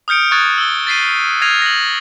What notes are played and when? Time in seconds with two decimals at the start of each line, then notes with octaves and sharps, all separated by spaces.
0.08 D#6 F6 G6 C#7 D7
0.31 C#6 D#6 F#6 G#6 A6
0.58 E6 G7
0.87 A6 B6 C7 D#7
1.41 F6 G#6 A#6 C7 D#7 F7
1.62 A#6 F#7